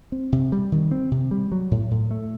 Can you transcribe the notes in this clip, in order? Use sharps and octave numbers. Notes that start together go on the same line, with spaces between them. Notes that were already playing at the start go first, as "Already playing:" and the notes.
C4
C3
G3
D#3
C4
C3
G3
F#3
A2
A2
A3